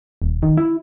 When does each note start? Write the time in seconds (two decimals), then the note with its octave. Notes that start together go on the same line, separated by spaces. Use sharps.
0.22 D#1
0.43 D#3
0.57 E4